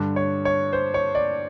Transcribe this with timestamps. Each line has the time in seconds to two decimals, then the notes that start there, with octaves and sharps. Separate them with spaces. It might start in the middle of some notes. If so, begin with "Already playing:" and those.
Already playing: G2 D3
0.16 C#5
0.45 C#5
0.73 C5
0.94 C#5
1.15 D5